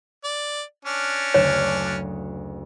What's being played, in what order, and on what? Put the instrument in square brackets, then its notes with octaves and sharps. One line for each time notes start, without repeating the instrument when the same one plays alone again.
[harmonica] D5
C#4 D4
[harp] F#1 D2 E7 [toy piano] C#5